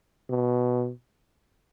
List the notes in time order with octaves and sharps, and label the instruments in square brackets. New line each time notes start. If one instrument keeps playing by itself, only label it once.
[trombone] B2